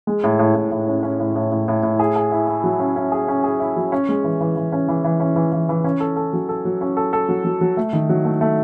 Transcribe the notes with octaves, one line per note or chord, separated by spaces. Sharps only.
G#3
A2
A2
A2
A2
C#4
C#4
A2
A2
A2
A2
A2
G#4
G#4
E4
E4
F#3
C#4
C#4
G#4
C#4
G#4
E4
F#3
C#4
G#3
E3
E3
E3
C#4
E3
E3
C#4
E3
E3
E3
C#4
A4
A4
F#3
A4
F#3
C#4
A4
A4
F#3
F#3
F#3
A3
D#3
F#3
A3
A3